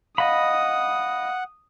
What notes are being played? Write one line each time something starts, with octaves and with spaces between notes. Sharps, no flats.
D#5 F5 F#5 B5 D#6